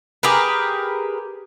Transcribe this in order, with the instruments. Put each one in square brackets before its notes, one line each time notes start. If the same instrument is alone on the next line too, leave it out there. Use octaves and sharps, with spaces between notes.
[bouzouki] G4 G#4 A#4 B4